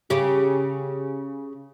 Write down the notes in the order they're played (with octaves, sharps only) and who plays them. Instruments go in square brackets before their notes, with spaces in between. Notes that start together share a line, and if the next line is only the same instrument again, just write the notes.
[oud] C#3 G4